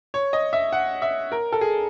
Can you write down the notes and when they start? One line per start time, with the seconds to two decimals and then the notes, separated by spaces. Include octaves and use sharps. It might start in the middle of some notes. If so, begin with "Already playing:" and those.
0.14 C#5
0.33 D#5
0.53 E5
0.73 F#5
1.02 E5
1.32 A#4
1.52 A4
1.61 G#4